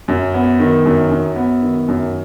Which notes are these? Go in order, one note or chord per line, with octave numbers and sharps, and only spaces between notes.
F#2
B3
D#3
F#2
F#2
B3
D#3
F#2